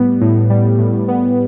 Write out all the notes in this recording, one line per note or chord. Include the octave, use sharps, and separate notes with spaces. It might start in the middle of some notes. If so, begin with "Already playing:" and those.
Already playing: A2 G3 B3
A2
G3
A2
B3